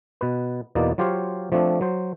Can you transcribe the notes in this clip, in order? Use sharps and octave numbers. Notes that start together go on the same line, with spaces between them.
B2 B4
E2 B2 A#3 D#4 D5
F#3 F4 G4 C5 C#5 F5
F3 A3 C4 D4
F#3 C5